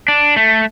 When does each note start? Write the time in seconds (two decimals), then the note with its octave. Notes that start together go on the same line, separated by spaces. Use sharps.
0.08 D4
0.36 A3